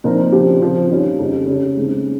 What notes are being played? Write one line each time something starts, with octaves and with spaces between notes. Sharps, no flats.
A#2 F3 C4 D#4 A#4
C#3 F3 C4 G4
C#3 F3 C4 F4
D#2 D#3 G3 C#4 F4
F2 C#3 G3
C#3 G3 C#4 G#4
D#2 C#3 G#3 C4